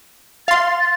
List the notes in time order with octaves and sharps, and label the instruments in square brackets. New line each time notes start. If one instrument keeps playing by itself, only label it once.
[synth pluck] F5 C6 [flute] A6